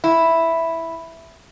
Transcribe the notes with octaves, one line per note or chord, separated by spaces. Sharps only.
E4